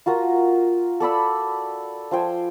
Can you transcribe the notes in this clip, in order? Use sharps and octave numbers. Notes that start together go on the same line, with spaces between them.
F4 F#4 A#4 A#5
A4 D5 B5 E6
F3 C5 G5 G#5